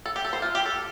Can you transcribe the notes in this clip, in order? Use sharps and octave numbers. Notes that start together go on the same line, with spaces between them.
A4
G4
A4
C5
F4
G4
A4